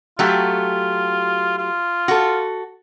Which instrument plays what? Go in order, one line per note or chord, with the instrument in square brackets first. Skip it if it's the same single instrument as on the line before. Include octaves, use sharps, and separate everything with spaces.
[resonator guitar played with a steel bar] F#3 A3 G4 [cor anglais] F4
[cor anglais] F4
[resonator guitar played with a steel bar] F#4 A4